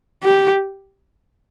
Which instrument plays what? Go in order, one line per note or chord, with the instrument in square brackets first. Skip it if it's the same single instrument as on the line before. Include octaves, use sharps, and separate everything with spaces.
[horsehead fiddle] G4